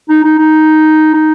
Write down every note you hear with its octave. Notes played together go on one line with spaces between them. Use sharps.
D#4
D#4
D#4
D#4